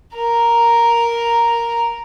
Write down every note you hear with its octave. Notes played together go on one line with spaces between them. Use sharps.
A#4 A#5